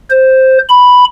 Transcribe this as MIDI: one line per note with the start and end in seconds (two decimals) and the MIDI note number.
0.10 0.58 72
0.69 1.04 83